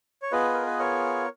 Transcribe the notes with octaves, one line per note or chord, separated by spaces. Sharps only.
C#5
B3 F4 G#4 B4 D#5
A#4
B4
A#4 C#5